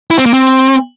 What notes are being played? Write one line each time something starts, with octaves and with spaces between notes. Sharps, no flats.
E4
C4
A#3
C4